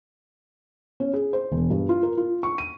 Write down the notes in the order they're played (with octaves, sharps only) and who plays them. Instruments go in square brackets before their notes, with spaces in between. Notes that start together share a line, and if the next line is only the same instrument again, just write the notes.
[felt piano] C#4
G#4
C5
E1
G2
F4
A#4
F4
C#6
D#7